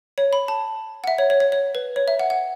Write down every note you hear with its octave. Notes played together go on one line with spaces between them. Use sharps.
C#5
B5
A5
F#5
E5
C#5
C#5
C#5
C#5
B4
C#5
E5
F#5
F#5